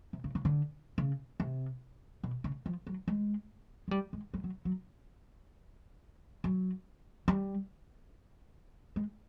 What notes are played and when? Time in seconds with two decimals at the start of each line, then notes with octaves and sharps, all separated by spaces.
0.13 C3
0.24 C#3
0.35 C#3
0.45 D3
0.98 C#3
1.40 C3
2.23 B2
2.44 C#3
2.66 F3
2.87 F#3
3.08 G#3
3.88 G#3
3.91 G3
4.13 G#3
4.34 G3
4.44 F#3
4.65 F#3
6.44 F#3
7.28 G3
8.96 G#3